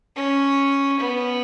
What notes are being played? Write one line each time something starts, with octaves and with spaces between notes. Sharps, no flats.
C#4
B3